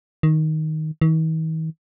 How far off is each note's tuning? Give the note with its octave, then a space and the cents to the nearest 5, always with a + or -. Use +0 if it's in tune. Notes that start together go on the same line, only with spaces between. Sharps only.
D#3 +5
D#3 +45